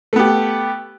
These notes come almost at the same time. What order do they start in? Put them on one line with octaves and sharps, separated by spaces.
A3 B3 G4